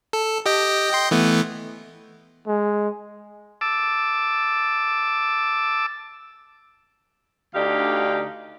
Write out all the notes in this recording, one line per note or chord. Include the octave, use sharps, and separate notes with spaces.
A4
G4 D#5 G5
D#5 G5 C6
E3 A3 B3
G#3
A5 D6 E6
D2 D3 D#4 G4 D5 F5